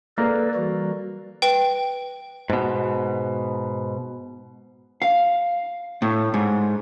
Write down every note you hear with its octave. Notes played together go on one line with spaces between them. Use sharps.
A#3 A4 B4 D5
E3 G3 F#4
B4 G5
G#2 B2
F5
A2
G#2